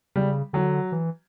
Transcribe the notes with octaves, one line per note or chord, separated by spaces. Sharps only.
C#3 G3
D3 F#3
E3